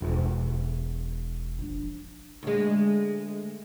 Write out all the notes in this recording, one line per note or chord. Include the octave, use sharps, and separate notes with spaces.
E1
F3 D4
D2 G#3